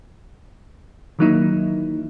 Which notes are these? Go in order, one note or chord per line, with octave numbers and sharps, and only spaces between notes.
D#3 E3 F#3 A#3 D#4 E4